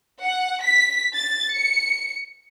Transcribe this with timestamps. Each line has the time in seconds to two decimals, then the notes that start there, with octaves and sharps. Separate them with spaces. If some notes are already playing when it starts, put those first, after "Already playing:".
0.22 F#5
0.65 B6
1.15 A6
1.55 C#7